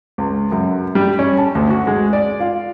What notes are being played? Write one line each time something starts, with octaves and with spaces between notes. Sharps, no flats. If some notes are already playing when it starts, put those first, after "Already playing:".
C#2
F#2
G3
C#4
A5
D2
F#4
G#3
D5
F4